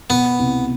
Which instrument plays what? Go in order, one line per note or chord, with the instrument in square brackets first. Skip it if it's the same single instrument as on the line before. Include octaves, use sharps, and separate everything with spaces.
[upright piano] B2 [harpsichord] B3
[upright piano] C2